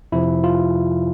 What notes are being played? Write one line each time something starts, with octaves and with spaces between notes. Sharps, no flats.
F2 C3 F3 E4
F4